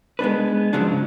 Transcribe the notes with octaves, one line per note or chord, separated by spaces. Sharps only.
G#3 B3 D4 B4
G#2 C#3 F3 F#3 D4